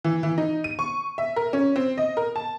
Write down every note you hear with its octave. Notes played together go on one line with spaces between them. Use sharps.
E3
E3
D#4
D#7
C#6
E5
A#4
C#4
C4
D#5
A#4
A5